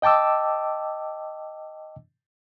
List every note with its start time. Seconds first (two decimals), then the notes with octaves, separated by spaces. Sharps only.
0.02 D#5 G5 A5 D6 E6